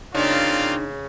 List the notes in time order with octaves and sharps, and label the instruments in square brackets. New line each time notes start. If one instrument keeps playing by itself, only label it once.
[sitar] C#3 [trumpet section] A#3 C4 F4 [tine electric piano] D4 D#4 [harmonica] D5